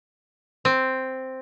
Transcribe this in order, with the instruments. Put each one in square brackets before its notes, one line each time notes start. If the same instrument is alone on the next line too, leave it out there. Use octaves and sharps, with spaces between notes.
[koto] C4